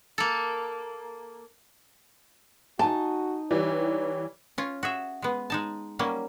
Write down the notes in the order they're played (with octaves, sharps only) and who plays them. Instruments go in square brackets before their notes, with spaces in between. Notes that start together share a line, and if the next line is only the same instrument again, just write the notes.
[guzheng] A#3 A4
[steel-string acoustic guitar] D#4 G#5 [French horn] F#4 [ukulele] A5
[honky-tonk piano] E3 G3 [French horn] C#5
[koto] C#4 F4
F#4 G#4 E5
G#3 B3
G#3 D#4 A5
F#3 G3 A#3 C#4